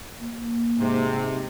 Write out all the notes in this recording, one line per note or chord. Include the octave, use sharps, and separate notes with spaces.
A#3
G#2 C3